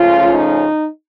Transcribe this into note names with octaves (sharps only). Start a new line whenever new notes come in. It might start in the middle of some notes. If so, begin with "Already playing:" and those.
Already playing: C#3 F3 A3 C#4 F4
D#4